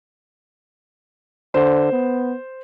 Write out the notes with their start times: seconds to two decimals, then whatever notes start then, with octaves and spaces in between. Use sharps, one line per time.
1.54 D3 C5
1.92 B3